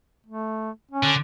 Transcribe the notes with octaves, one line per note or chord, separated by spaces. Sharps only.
A3
C#4
D3